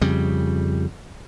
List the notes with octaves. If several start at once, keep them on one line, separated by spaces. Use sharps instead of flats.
F2 C#3 G3